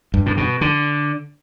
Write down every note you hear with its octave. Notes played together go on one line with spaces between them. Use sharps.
G2
A2
B2
D3